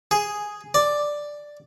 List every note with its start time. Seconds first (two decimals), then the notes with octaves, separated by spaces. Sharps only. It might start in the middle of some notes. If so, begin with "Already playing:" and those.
0.11 G#4
0.74 D5